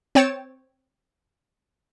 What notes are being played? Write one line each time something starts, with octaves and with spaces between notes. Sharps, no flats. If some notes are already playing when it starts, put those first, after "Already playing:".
C4 C#5 G5 A6 C#7 E7